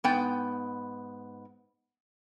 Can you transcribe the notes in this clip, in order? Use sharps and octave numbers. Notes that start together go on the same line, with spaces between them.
G#2 B3 G5